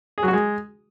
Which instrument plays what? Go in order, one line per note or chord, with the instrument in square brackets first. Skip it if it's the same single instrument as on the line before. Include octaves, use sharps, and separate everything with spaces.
[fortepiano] G#4
F#3
F#4
G#3